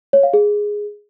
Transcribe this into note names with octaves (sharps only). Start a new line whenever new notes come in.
C#5
F5
G#4